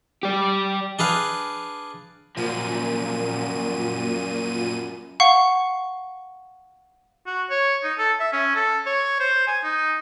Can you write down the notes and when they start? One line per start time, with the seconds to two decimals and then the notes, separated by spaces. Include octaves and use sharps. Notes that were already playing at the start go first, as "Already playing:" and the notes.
0.23 G4 D5
0.99 D4 G#4 B4 F5
2.37 F#2 A#2 F3 D#7
5.20 F5 F#5 C#6
7.27 F#4
7.51 C#5
7.83 D#4
7.98 A4
8.20 E5
8.33 C#4
8.55 A4
8.86 C#5
9.20 C5
9.47 G#5
9.64 D#4